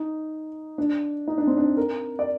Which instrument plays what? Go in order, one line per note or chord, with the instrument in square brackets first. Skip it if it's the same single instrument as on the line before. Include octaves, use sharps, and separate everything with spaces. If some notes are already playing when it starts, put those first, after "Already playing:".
Already playing: [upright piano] D#4
D4
D#4
D4
C4
D4
A#4
D5